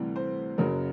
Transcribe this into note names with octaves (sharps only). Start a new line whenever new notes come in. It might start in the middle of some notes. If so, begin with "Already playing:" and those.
Already playing: D2 C3 E3 G3
C5
F#1 F#2 C#3 F#3 A#4